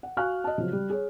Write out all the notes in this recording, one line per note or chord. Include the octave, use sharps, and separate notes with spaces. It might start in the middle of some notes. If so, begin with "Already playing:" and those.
F#5
F#4 F5 G#5 C#6 F6 F#6
D#5 A5
C#3 F3 F#3
G3
G#4 C#5